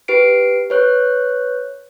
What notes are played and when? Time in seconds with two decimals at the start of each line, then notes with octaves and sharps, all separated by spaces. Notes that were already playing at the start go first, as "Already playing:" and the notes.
0.08 G4 B4 C7 D7
0.70 B4 C#5 F#6